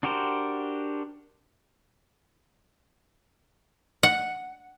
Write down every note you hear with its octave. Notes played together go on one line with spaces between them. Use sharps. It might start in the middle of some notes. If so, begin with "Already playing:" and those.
D4 F#4 G4 A#4 C5
F#5